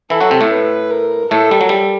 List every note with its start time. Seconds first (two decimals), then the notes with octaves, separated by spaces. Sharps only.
0.10 E3 E4 A4
0.21 F#3 F#4
0.31 C3 C4
0.41 A2 A3
0.51 B4
0.91 A#4
1.31 A2 A3 A4
1.51 G3
1.61 F#3
1.69 G3